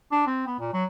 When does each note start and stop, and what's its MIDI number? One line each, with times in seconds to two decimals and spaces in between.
0.11 0.24 62
0.26 0.44 60
0.46 0.55 59
0.59 0.70 46
0.73 0.84 54